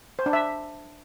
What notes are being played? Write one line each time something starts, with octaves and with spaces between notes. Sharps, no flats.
C5
D4
E5